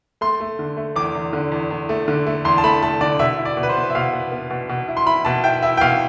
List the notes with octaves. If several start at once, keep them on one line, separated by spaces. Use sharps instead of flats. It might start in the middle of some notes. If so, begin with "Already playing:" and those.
A3 C6
A3
D3
A3
E2 D6
E2
D3
E2
E2
A3
D3
A3
E2 C6
A5
A3 B5
A3 A5
D3 D5
B2 E5
E4
D5
B2
B4
C5
B3
E5
B2 F5
B3
B3
B2
B2
E4
C6
E4 B5
B2 A5
E4 G5
E4 E5
G5
B2 F5